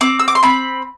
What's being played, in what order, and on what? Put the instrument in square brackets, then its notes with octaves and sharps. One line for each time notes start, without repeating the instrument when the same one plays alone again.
[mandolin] C4 D6
E6
D6
C6
C4 B5